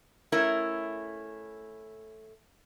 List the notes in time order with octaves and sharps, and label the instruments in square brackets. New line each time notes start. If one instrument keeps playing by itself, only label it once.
[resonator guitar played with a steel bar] A3 C#4 E4 A#4